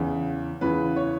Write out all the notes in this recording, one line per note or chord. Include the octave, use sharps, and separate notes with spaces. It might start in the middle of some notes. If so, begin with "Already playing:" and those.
Already playing: E2 C#3 E3
E2 C#3 E3 B4
C#5